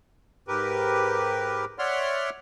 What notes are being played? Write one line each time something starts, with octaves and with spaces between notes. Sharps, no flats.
G#2 G4 A#4 B4
C#5 D5 E5 F#5 C6 F6